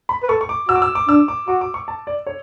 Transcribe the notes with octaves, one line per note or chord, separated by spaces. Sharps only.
B5
B4
A4 C#6
C#6
D6
F#4 E6
D6
E6
D6
D4 E6
D6
F#4 D6
D6
C#6
A5
D5
C#5